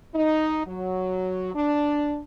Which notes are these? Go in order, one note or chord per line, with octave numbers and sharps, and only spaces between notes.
D#4
F#3
D4